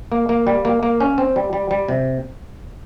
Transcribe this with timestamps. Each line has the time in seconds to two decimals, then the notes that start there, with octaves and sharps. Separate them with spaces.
0.12 A#3
0.29 A#3
0.47 G3
0.65 A#3
0.83 A#3
1.00 C#4
1.18 C4
1.36 G3
1.53 G3
1.71 G3
1.89 C3